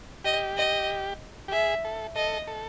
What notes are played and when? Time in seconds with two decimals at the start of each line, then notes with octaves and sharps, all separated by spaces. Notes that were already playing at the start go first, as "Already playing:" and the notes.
0.24 G4 D#5
0.57 D#5
1.48 G4
1.52 G#4 E5
1.85 A4
2.16 A4 D#5
2.48 A4